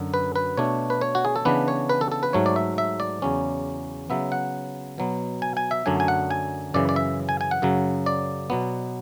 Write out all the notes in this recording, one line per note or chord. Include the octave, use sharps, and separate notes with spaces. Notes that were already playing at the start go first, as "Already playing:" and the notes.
Already playing: F#2 D3 F#3
B4
B4
B2 A3 D4 C#5
B4
C#5
F#4
G#4
A4
C#3 E3 B3 D4 B4
C#5
B4
A4
A4
B4
G#2 F#3 A3 C#5
D5
E5
E5
D5
E2 C#3 F#3 C#4
C#3 F#3 B3 E5
F#5
B2 F#3 B3
G#5
G#5
E5
F#2 D3 F#3 A3 D4 G#5
G#5
F#5
G#5
F#2 C#3 E3 D5
D5
E5
G#5
G#5
F#5
F#2 C#3 F#3
D5
B2 F#3 B3